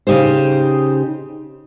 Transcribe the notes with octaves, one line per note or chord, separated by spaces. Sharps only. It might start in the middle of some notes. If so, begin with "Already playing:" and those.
C#3 D#4 G4 C5